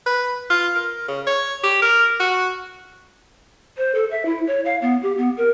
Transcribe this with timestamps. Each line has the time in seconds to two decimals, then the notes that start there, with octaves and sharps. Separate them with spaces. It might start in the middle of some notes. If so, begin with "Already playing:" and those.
0.06 B4
0.50 F4
0.75 A#4
1.08 C#3
1.27 C#5
1.63 G4
1.82 A#4
2.20 F#4
3.77 C5
3.95 A4
4.11 E5
4.26 E4
4.47 C#5
4.65 F5
4.82 B3
5.03 G4
5.18 B3
5.37 A#4